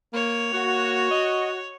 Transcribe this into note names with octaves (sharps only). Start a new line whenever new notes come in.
A#3 C#5
A#3 F#4
D#5